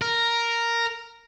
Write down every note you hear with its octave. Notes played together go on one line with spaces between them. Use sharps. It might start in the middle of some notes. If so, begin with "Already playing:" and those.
A#4